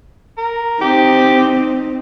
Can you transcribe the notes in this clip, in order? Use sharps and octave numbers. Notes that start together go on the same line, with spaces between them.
A#4
C4 D#4 G4